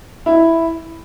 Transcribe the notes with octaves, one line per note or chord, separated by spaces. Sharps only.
E4